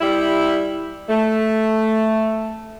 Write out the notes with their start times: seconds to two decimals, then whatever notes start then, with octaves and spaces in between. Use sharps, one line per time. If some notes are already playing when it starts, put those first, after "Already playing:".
0.01 G3 E4
1.10 A3